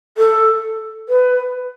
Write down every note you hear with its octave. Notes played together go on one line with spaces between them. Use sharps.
A4
B4